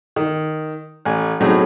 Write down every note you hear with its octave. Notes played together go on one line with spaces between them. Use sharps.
D#3
A1 G#5
B1 A2 F#3 C4 D#4 G#4